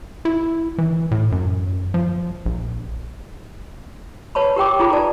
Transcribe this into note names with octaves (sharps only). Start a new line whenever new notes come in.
E4
E3
A2
F#2
F3
A#1
B4 C#5 A5 B5
G4 A#4 G5 D6
D#4 F4 G#4 A4 A#5 B5
B4 D5 A5